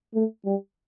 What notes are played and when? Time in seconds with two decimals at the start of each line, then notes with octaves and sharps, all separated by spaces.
0.15 A3
0.46 G3